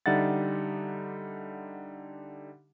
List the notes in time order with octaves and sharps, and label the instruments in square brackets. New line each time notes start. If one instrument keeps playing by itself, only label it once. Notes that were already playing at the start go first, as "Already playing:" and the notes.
[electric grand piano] D3 G3 D#4 E5 F#5 A6